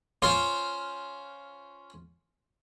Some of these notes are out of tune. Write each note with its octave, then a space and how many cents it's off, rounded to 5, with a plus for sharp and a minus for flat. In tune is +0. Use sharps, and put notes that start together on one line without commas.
C#4 +5 F4 +0 C5 +0